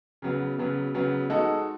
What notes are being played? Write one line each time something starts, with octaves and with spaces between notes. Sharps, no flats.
C#3 F#3 B3
C#3 F#3 B3
C#3 F#3 B3
G#3 D#4 F#4 A4